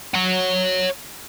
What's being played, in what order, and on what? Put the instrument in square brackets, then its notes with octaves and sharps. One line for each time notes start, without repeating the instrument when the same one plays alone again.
[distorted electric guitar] C#5 F#5